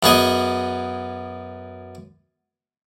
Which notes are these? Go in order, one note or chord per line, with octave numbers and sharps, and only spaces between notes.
F#2 B3 G#4 D#5